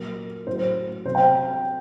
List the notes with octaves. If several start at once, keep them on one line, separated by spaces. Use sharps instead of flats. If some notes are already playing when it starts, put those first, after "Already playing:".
Already playing: A#2 F#3 A#4
A2 F#3 C5
C3 F#3 C5
G5